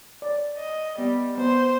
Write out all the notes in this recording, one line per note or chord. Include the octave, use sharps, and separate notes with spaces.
C#5 D5
D#5
G3 B3
B3 C5